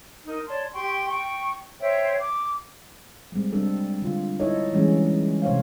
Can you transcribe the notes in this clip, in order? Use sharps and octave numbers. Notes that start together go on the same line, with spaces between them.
D#4 A#4
C#5 D5 A5 C6
G4 G5 C6 C#6
G5 C#6
C5 C#5 E5 G5
D6
G3 G#3 C4
G3 C4 D4 A4
D3 F4
D#4 E4 A4 C#5 D#5
E3 G3 G#3 C#4
C3 C5 C#5 F5